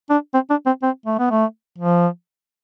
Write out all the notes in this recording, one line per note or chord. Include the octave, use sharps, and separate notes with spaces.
D4
C4
D4
C4
C4
A3
B3
A3
F3